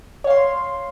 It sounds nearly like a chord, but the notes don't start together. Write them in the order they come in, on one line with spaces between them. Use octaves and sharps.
C#5 F5 C6